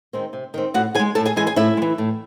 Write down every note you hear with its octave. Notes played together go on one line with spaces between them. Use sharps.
D#3 G#3 C4
C3
D#3 G#3 C4
A2 F#4 F#5
E3 G#4 G#5
G#3
A2 A4 A5
G#4 G#5
E3 G#3 G#4 G#5
G#4 G#5
A2 E4 E5
G#3
E3
A2